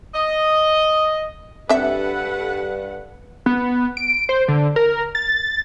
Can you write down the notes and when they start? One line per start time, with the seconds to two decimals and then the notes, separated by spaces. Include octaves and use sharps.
0.14 D#5
1.69 G2 C4 D4 A4 B4 E5 F#5
3.46 B3
3.97 D7
4.29 C5
4.48 D3
4.76 A#4
5.15 A6